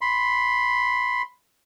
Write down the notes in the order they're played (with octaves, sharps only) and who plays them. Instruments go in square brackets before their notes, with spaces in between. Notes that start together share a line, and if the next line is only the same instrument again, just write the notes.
[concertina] B5 C6